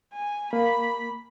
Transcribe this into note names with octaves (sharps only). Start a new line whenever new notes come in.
G#5
A#3 B5